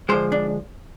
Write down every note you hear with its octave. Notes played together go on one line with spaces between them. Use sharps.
D3 F3 G#3 C5
D4